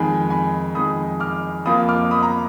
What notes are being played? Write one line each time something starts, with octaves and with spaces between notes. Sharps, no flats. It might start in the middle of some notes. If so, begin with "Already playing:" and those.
Already playing: F2 D#3 G#3 D#4 G#5 B5
G#5 B5
F2 D#3 G#3 D#4 B5 D#6
D6 F6
F2 F3 A#3 F4 B5 D#6
D6 F6
B5 D#6
A#5